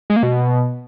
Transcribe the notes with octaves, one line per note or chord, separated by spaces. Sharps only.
G#3
A#3
B2